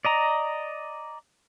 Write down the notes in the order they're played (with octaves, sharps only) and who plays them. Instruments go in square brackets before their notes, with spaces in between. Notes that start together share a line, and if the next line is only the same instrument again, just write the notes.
[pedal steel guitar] D5 D#5 A#5